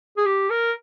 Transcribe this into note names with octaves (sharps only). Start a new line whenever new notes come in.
G#4
G4
A#4